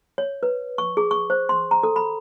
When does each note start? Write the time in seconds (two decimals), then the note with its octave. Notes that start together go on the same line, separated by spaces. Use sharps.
0.18 C#5
0.43 B4
0.78 C#6
0.97 G#4
1.11 C#6
1.30 C5
1.49 C6
1.71 A#5
1.83 A4
1.96 B5